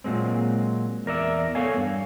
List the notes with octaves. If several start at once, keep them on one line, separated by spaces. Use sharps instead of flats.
A#2 C#3 F#3 G#3 C4
E2 A#4 D5 E5
B3 A4 C#5 F5 G#5
G2